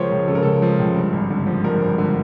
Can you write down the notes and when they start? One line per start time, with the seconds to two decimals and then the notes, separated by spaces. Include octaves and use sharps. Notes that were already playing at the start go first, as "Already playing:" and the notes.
Already playing: C#2 C#3 F3 A#4 C5 C#5
0.10 C#2
0.28 C#3 A4
0.35 A#4
0.43 C#2 A4
0.62 F3
0.80 C#2
0.96 G2
1.13 G#1
1.30 D3
1.47 F3
1.64 G2 A#4
1.82 G#1
1.98 D3